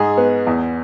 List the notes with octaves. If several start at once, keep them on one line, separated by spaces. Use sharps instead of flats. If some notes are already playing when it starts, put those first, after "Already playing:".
Already playing: G#2 G#4
B3
E2